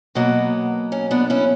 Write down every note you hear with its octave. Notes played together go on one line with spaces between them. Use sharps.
B2 F#3 A#3 B3
C#4
B3 D4
C#4 E4